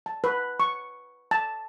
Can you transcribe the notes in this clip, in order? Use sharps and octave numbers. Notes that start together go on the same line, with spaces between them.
A5
B4
C#6
A5